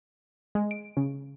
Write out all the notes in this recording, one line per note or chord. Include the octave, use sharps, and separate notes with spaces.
G#3
D7
C#3